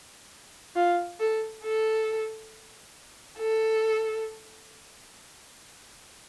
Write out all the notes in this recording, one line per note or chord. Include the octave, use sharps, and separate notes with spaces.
F4
A4
A4
A4